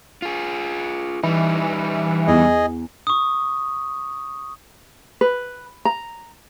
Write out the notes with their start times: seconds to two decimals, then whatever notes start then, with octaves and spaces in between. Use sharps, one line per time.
0.22 F4 G#4
1.23 E3 G3 D#4
2.27 E2 G#4 D#5
3.07 C#6 D#6
5.21 B4
5.85 A#5